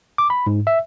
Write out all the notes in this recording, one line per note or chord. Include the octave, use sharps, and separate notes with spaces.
D6
B5
G#2
E5